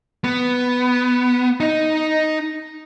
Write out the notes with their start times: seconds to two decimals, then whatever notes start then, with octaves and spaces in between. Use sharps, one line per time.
0.24 B3
1.60 D#4 D#5